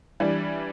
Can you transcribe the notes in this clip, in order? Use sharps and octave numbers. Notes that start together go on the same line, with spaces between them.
E3 G3 D4